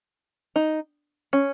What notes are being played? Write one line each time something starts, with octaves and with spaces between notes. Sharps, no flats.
D#4
C#4